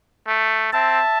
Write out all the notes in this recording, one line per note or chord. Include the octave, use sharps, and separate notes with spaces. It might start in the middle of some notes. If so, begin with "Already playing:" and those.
A3
C4 E5 A5